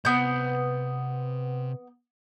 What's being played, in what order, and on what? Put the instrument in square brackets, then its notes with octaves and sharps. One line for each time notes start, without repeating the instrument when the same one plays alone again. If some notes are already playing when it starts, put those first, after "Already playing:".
[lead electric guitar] C3 B5 [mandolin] B3 G6